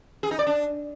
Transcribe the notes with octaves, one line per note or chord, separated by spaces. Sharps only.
G#4
D#4
D5
D4